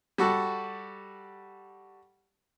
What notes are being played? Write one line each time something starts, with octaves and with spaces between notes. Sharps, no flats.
G3 F#4 A4